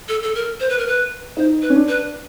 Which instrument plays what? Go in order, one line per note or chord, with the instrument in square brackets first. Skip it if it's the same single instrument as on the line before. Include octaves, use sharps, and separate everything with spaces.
[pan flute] A4
A4
A#4
C5
B4
A#4
B4
[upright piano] D#4 [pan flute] C5
[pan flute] B4
[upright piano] C#4
D4
[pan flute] B4